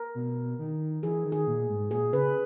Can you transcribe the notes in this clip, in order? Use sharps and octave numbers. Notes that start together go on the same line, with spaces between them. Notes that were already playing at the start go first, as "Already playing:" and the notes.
Already playing: A#4
B2
D#3
E3 G#4
D#3
G#4
A#2
G#2
A#2 G#4
C#3 B4